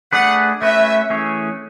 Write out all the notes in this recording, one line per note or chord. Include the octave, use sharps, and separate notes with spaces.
A3 D4 G#4 B4 F#5
A3 C#4 F#4 B4 E5
E3 A3 C#4 G#4 C#5